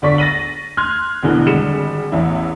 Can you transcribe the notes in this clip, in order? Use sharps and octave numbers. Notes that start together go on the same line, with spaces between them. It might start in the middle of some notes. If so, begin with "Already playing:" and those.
G1 D3 D5 C#6 B6
A6 A#6 D#7 F#7
C6 F6 F#6 G#6
G#1 E2 B2 D3 E3
G#1 D3 G3 G#3 C#7 E7
A1 E2 E4